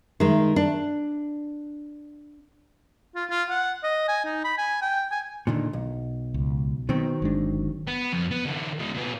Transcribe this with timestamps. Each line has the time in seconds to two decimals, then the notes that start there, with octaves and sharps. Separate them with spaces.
0.20 D#3 G#3
0.56 D4
3.15 F4
3.30 F4
3.50 F#5
3.83 D#5
4.08 G#5
4.24 D#4
4.44 B5
4.58 G#5
4.81 G5
5.11 G#5
5.47 A#2 D3 D#3
5.73 B1
6.34 C#2
6.89 B2 D#3 F#3 C4
7.22 G1 G#3 D4
7.87 B3
8.13 F2
8.31 B3
8.46 D3 E3
8.79 E2 G#3
8.95 A#2 B3